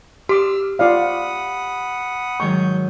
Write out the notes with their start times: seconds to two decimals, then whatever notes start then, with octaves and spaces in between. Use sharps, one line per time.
0.29 G4 C6 D6 E6 F6
0.79 F4 D5 F5 F#5 B5 D#6
2.40 G#2 D#3 F#3 C#6 G6